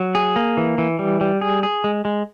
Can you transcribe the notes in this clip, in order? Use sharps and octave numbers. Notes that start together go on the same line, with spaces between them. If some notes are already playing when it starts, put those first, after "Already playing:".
Already playing: F#3
G#4
A#3
E3
E3
G3
G3
G#4
G#4
G#3
G#3